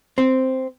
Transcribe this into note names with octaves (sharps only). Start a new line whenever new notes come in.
C4